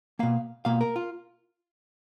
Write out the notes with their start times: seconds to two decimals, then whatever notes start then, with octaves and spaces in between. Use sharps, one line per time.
0.19 B2 A#3 F5
0.65 B2 A#3 F5
0.81 A#4
0.96 F4